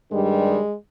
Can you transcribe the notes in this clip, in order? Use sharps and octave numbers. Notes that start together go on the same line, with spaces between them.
G2 D#3 G3 G#3